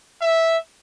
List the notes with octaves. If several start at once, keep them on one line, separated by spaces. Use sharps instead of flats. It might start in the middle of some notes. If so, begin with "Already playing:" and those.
E5